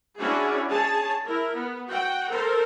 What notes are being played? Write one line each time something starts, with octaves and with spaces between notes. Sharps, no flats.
C#4 D4 E4 F#4 G#4
G#4 C#5 A5
E4 A#4
B3
F#4 F#5 G5
A4 A#4 C5